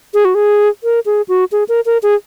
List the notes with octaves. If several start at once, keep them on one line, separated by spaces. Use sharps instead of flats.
G#4
F#4
G#4
A#4
G#4
F#4
G#4
A#4
A#4
G#4